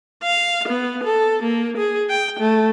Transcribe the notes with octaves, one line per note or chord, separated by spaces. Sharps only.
F5
B3
A4
A#3
G#4
G5
A3